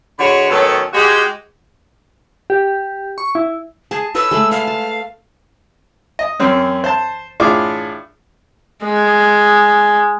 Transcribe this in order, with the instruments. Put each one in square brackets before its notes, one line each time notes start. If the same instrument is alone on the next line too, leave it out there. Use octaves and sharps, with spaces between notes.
[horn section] D3 G#3 F#4 C#5 B5
A2 D#3 F#3 B3 C#4 A4
G#3 F#4 G4
[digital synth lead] G4
C#6
E4
[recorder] G#4 [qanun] A5
[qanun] A4 B4 C#5 [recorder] E6
[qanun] G#3 A3 B5
[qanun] E5 [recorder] F5
[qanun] A5
[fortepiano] D#5
F#2 C4 C#4
C5 A5
A2 D4 F4 G#4 D6
[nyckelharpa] G#3